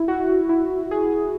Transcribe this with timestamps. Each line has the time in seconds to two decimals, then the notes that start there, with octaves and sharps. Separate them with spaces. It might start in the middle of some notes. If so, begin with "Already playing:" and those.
Already playing: E4
0.08 F#4
0.49 E4
0.91 G#4